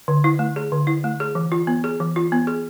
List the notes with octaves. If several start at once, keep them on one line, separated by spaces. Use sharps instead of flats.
D3
E4
A3
G#4
D3
E4
A3
G#4
E3
F4
B3
G#4
E3
F4
B3
G#4